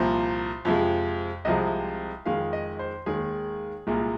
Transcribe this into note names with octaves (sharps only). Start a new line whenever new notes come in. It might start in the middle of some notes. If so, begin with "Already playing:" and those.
Already playing: C2 A#2 F3 C5
F2 C3 F3 G#3
C2 C3 F3 G#3 D#5
F2 D#3 G#3 F5
D#5
C5
D#2 D#3 G#3 G#4
C2 A#2 G#3